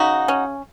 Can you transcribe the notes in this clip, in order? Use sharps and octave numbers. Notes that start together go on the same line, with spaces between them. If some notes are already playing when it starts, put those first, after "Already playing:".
Already playing: C#3 D#4 F#4
C#4